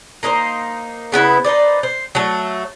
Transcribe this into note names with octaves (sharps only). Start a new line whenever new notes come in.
A#3 D#4 F#4 C5
C#3 B3 E4 B4
D#4 B4 C5 D5
C5
F#3 A3